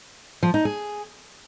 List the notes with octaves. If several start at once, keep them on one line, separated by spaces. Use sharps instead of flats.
F3
D#4
G#4